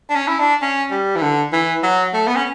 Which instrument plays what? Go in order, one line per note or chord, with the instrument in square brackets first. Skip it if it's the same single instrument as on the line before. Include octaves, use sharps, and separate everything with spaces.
[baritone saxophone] D4
C#4
E4
D4
C#4
G3
E3
D3
E3
F#3
A3
B3
C#4